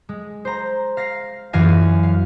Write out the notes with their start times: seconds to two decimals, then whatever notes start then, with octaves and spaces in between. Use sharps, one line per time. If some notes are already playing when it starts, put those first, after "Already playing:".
0.09 G#3
0.45 C5 A#5
0.97 F5 A#6 C7
1.53 F#2 E3 F5 G#5 A#6
2.03 F5